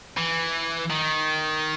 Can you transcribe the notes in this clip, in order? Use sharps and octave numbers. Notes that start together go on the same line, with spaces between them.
E3
D#3